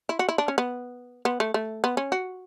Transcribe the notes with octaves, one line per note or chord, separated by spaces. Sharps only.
E4
F#4
E4
D4
C#4
B3
B3
A3
A3
B3
C#4
F#4